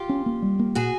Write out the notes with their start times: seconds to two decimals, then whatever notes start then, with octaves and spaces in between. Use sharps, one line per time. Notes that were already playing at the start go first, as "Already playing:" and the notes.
Already playing: F4 G4
0.09 C#4
0.26 A#3
0.42 G3
0.59 A#3
0.75 A#2 F#4 G#4